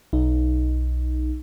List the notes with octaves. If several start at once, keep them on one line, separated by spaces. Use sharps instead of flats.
B1 D#4